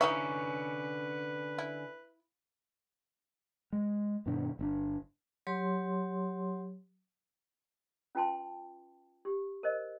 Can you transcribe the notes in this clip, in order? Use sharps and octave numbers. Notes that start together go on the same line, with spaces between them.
D3 E3 C#4 D#4 B4 E5 C#6
E4
G#3
G2 B2 D#3 D4
G1 C#4 D4
F#3 G4 C#5 C6
C#4 F4 B4 G5 A5 C6
G4
A#4 C5 D#5